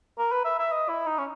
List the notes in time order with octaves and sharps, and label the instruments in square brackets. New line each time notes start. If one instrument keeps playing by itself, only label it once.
[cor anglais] A#4
B4
E5
E5
D#5
E4
D#4
C#4